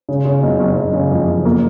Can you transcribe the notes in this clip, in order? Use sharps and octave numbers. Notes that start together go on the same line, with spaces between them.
C#3
C#3
F#1
F#1
F#1
C#3
F2
F#1
A#3